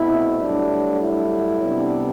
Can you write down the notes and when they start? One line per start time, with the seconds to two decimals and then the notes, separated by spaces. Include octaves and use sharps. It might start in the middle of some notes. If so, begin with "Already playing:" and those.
Already playing: B2 A3 C4 E4
0.41 G2 F#3 A3 D4
1.01 E4
1.61 C3 G3 B3 D4